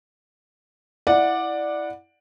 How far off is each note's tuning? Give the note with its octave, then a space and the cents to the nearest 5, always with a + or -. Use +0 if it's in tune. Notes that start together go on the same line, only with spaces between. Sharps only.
E4 +0 D5 +10 F#5 -15